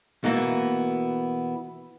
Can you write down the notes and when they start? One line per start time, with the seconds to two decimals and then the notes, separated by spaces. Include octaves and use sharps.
0.24 B2 E3 A#3 B3 E4